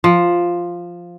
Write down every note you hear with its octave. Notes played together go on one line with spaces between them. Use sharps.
F3